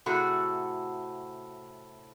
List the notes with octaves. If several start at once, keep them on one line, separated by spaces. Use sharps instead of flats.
A2 C3 F#4 G#4 A4